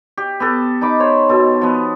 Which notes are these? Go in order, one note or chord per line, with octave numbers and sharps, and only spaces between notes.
G4
B3 G4 A4
D#4 A5 B5 D6
C5 C#5 B5
B2 A4
F3 B3